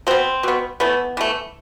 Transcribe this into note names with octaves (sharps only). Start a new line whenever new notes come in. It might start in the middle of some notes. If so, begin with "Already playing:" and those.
B2 B3 C4
B2 B3
E3 A3 B3
E3 A3